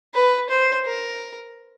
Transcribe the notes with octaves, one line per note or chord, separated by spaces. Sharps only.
B4
C5
A#4